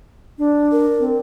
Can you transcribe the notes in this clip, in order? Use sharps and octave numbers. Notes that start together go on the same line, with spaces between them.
D4
A#4
C4